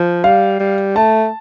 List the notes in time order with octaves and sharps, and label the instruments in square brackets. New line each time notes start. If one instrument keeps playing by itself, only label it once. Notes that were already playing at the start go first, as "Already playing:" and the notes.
Already playing: [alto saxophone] F3
[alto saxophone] G3 [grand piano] F5
[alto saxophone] G3
[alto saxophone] A3 [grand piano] A5